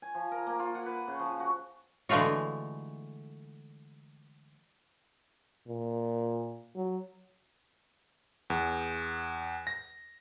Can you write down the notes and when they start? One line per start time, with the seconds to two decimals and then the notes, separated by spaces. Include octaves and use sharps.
0.02 G#5
0.15 F3
0.31 A#4
0.47 A#3
0.59 F4
0.75 F#5
0.86 B4
1.08 C#3
1.19 F3
1.40 F#4
2.09 D3 E3 G#3 A3 F4 F#4
5.67 A#2
6.76 F#3
8.50 E2
9.67 A#6